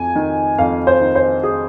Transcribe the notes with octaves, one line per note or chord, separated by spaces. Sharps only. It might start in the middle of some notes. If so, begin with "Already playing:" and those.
Already playing: F2 G#5
D#3
F2 F5
C5
D#3
C5
G#4